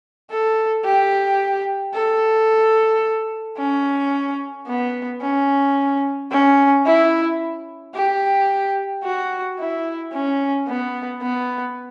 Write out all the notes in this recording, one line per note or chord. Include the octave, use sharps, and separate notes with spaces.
A4
G4
A4
C#4
B3
C#4
C#4
E4
G4
F#4
E4
C#4
B3
B3